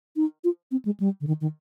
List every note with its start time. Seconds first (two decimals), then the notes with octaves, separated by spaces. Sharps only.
0.16 D#4
0.44 F4
0.71 C4
0.85 G#3
1.00 G3
1.21 D3
1.27 D#3
1.41 D#3